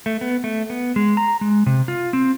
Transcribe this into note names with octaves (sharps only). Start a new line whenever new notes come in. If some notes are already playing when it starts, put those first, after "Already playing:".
A3
B3
A3
B3
G#3
A#5
G#3
C3
F4
C4